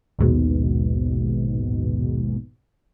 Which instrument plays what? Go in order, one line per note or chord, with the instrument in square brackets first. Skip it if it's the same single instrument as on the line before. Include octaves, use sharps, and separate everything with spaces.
[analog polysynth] A#1 D#2 G#2 B2